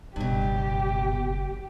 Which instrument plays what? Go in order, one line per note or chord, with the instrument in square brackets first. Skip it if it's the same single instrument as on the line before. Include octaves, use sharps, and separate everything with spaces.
[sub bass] F#1 [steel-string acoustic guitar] G2 B2 [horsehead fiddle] G4